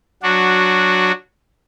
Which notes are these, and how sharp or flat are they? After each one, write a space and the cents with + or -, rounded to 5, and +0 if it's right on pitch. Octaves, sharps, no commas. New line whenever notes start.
F#3 +0 D4 +0 F#4 -10